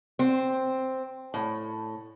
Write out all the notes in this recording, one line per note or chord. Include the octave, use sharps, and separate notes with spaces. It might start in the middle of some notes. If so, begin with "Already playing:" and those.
C4
A2